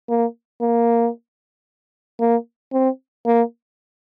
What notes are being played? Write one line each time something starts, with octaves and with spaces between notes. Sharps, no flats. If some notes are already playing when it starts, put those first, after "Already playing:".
A#3
A#3
A#3
C4
A#3